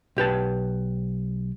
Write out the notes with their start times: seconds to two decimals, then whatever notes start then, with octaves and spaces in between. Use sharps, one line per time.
0.17 B1 G4 B4 A5